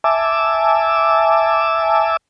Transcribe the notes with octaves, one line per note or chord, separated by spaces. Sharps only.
E5 G#5 A5 D6 E6